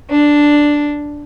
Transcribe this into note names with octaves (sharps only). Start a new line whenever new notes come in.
D4